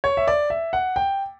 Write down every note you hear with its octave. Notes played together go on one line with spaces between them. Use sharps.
C#5
E5
D5
E5
F#5
G5